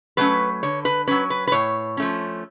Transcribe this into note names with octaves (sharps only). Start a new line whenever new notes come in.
F#3 A3 C#4 B4
D3 C#5
B4
F#3 C#4 B4
B4
B4
A2 C#5
F3 A3 C#4